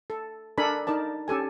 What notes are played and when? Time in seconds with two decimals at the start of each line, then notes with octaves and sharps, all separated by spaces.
0.10 A4
0.58 D4 A4 A#4 G#5 B5
0.87 D#4 A#4 D5 A5
1.28 C#4 G4 A4 G#5